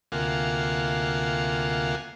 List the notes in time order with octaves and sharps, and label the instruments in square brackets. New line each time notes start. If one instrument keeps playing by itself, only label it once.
[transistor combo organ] D2 C3 A#3 F4 F#5 G#5